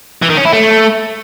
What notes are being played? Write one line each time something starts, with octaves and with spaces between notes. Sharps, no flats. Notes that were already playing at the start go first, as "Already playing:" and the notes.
E3
D#3
C#4
E4
A3